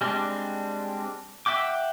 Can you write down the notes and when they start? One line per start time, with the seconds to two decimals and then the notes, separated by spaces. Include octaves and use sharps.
0.01 G3 G#3 C4 D4
1.46 E5 F#5 G5 D6